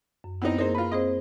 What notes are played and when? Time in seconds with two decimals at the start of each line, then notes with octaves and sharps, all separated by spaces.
0.24 F#2
0.42 B3 C4 D#4 E4
0.58 A#3 D#4 G#4 A#4 C5
0.75 F4 B4
0.92 C4 G#4 C5 D#5